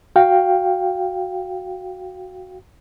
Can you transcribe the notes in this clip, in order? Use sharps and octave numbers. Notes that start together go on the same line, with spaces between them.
F#4 F5 G5